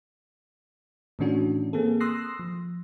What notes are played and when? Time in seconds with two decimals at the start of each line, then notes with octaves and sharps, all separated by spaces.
1.19 A2 D#3 E3 C#4 D4 F#4
1.73 A#3 C4 G#4 A4
2.00 C6 D#6 E6 F#6 A#6 C7
2.39 F3